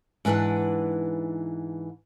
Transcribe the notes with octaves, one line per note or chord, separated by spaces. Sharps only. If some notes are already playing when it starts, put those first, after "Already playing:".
G#2 E3 D4 B4 F#5